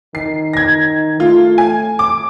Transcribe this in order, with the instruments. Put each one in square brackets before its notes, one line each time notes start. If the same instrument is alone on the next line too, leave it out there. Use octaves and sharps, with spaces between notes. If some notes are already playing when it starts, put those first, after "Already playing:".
[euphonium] D#3 [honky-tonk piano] C7
[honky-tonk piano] G#6 A#6
[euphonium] A3 [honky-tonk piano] F4
[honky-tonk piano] G#5
D6